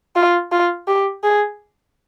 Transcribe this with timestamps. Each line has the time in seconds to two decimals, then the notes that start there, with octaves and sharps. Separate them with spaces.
0.16 F4
0.52 F4
0.88 G4
1.24 G#4